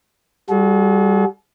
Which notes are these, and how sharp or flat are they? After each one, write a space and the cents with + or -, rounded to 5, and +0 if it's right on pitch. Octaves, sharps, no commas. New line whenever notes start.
G3 +0 F#4 -20 A4 -45